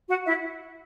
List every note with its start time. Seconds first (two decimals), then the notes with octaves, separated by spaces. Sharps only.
0.08 F#4 F#5
0.26 E4 E5